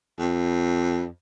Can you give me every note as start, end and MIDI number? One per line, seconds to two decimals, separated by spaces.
0.18 1.06 41